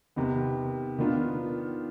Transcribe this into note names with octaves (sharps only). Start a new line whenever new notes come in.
C3 D#3 B3
D#3 B3 D4 F4